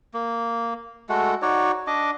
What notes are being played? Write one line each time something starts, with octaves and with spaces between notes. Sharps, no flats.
A#3
G#3 A3 F#4 A4
D#4 F#4 C#5 D5
D4 D#5 D6